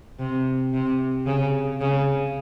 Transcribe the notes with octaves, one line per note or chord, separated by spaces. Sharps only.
C3
C3
C#3
C#3